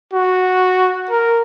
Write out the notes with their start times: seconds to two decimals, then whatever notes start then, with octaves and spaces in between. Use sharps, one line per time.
0.13 F#4
1.10 A#4